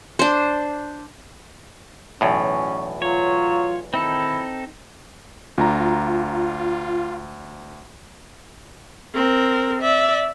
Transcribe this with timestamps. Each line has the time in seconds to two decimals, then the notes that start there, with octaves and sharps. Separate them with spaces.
0.19 D4 C5
2.21 B1 E2 A2 C#4
3.02 F#3 F4 C#5
3.94 D#3 C4 D#4 E4 A4
5.58 D2 D4 F4 A#5
9.15 C4 A#4
9.81 D5 E5